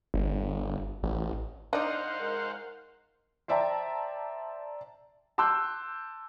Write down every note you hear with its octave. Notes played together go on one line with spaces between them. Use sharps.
G1
A1
D4 D#4 C5 D5 F5 F#5
G#3 A#4
C5 D5 E5 G5 A5 A#5
A5 C6 D6 E6 F#6 G6